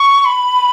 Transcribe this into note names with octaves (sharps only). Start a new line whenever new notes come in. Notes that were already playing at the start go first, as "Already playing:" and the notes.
Already playing: C#6
B5